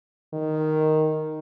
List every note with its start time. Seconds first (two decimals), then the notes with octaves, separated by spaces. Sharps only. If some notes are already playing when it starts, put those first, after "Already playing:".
0.33 D#3